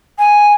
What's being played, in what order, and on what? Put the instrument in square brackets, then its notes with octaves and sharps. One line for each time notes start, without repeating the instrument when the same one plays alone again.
[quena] G#5